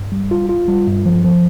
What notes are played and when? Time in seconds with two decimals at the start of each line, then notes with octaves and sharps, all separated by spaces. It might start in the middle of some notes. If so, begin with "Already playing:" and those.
Already playing: G2
0.12 G3
0.31 F4
0.49 F4
0.68 G3
0.87 G2
1.06 F3
1.25 F3